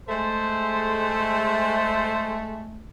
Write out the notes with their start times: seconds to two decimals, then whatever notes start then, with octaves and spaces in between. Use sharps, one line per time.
0.09 G#3 A3 C5